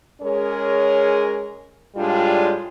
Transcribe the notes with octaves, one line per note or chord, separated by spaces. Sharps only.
G#3 C#4 G#4 A#4 C#5
A2 G3 G#3 D4 F4